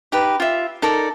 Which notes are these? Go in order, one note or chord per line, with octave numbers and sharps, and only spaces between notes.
D#4 G4 B4
F4 E5
D#4 A4 A#4 D5